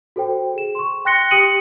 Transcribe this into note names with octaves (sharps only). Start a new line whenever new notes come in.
F#4 A4 C5 G5
G#4 E7
C6 C#6
G5 C6 F#6 A#6 C#7 G7
G4 G5 D#6 C#7 D#7 F#7